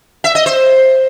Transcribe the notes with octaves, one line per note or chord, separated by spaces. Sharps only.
E5
D#5
C5